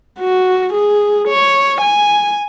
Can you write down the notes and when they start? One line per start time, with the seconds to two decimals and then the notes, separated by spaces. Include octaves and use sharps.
0.20 F#4
0.73 G#4
1.28 C#5
1.81 G#5